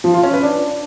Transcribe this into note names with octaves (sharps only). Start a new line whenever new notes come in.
F3
F4
C#4
B4
D4